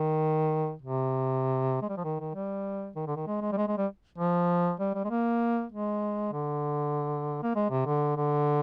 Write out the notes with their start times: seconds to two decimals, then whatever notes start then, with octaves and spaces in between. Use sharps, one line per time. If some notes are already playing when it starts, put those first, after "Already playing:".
Already playing: D#3
0.81 C3
1.82 G#3
1.89 G3
1.97 F3
2.04 D#3
2.20 D#3
2.35 G3
2.96 D#3
3.07 D3
3.16 D#3
3.27 G#3
3.42 G#3
3.52 G3
3.57 G#3
3.68 G#3
3.78 G3
4.18 F3
4.80 G3
4.94 G3
5.05 G#3
5.10 A#3
5.72 G#3
6.32 D3
7.43 A#3
7.56 G#3
7.70 C3
7.86 D3
8.16 D3